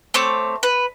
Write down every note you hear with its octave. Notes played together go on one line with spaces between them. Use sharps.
A3 C4 C#5 D6
B4